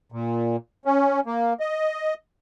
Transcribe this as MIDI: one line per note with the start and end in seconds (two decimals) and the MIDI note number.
0.12 0.56 46
0.85 1.20 61
1.26 1.53 58
1.60 2.14 75